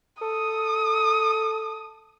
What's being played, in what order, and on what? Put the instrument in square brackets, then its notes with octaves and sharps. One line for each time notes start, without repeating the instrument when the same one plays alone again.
[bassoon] A4 [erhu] D#6